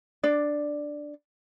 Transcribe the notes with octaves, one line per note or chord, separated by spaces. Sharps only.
D4 D5